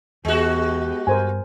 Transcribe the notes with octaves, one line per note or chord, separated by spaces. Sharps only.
E2 G#3 B3 F#4 G4
G2 A#4 C5 G#5